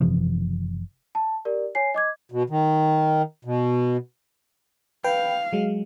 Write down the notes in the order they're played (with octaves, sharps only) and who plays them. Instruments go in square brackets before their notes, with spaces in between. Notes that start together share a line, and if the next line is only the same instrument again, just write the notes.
[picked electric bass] F#1 C3 E3 F3
[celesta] A5
G4 A#4 D5
C#5 G#5 C7
D#5 D6 G#6
[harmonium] B2
D#3
B2
[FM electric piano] B4 G5 [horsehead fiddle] F5
[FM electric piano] F#3 G#3